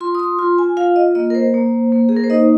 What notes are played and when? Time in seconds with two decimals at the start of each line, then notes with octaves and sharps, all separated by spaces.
0.01 F4 C6
0.15 D#6
0.19 C6
0.39 F4 C6
0.58 G#5
0.77 F4 F5
0.96 D#5
1.15 A#3 D#5
1.30 A#4
1.35 C5
1.54 A#3
1.92 A#3
2.09 G#4
2.16 A#4
2.24 C5
2.30 D#4 D#5